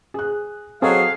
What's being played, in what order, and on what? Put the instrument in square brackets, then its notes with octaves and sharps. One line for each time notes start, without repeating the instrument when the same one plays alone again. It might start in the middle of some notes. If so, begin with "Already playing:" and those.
[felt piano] G#4 F#6
[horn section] F#3 G#4 [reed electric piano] C4 [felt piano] A4 C#5 D#5 [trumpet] F5